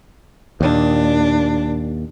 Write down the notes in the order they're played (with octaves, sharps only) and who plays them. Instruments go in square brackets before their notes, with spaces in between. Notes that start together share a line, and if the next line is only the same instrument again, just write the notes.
[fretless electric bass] D#2 [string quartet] A#2 D4